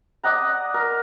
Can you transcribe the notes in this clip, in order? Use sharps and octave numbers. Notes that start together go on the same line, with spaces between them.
D5 D#5 F#5 A#5
A#4